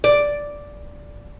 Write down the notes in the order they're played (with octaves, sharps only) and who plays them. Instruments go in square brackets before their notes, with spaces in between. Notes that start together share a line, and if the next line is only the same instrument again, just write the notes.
[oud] D5